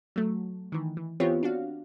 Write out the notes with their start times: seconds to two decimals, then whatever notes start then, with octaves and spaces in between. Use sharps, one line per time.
0.16 F#3 A3
0.72 D#3 E3
0.97 E3
1.20 E3 B3 C4 F4 G4 C#5
1.43 D4 F#4 F5